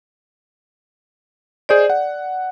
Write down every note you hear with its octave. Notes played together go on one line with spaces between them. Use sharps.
G#4 C5 D5 D#5 G6
F#5